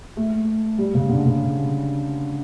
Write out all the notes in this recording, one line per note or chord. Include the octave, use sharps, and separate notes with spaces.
A3
G3
C#3
D3
C#3